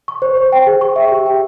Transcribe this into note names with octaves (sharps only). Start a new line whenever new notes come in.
C#6
C5
C5
G5
G#4
C#6
E5
G4
G5